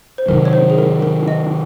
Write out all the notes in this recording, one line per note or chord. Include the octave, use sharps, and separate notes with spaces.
C5
C3 D#3 F#3 A#4
C#5
C5
G#4
A#4
A#4
D#5